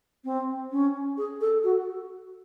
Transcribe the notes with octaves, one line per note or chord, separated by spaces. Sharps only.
C4
C#4
G#4
A4
F#4